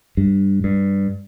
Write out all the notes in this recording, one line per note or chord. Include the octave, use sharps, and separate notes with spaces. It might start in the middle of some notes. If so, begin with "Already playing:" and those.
G2
G2